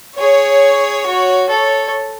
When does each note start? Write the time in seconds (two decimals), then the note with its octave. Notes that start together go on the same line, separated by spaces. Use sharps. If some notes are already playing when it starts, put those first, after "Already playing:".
0.18 G#4 C#5
1.06 F#4
1.49 A4 C#5